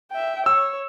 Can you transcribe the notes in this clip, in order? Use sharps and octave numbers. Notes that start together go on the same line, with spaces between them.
E5 G5
C#5 E6